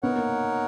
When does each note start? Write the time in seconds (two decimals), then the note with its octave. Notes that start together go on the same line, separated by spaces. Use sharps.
0.03 B3 D#4 A#4 C#5 F#5
0.16 A#3